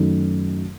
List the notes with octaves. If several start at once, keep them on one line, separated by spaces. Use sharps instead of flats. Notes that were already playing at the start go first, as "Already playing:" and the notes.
Already playing: F#2 D#3 F#3 A3 D#4